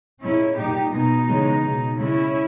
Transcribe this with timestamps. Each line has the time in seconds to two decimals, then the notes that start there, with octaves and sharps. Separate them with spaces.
0.22 A#2 G#3 C#4 E4
0.57 A#2 G3 D#4 G4
0.92 B2 G#3 B3 D#4
1.28 C#3 E3 G#3
1.63 B2 G#3
1.97 C#3 G#3 C#4 E4